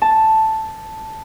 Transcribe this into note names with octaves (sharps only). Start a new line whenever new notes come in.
A5